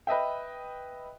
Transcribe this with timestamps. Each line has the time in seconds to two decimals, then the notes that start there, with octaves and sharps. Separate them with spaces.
0.07 B4 D#5 E5 G5